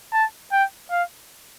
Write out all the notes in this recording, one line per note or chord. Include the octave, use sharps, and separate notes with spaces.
A5
G5
F5